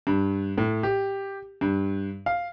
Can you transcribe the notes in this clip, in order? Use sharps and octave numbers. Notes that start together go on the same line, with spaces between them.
G2
A2
G4
G2
F5